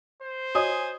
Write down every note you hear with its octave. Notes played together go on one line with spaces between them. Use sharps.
C5
F#4 C#5 D#5 G#5 D#6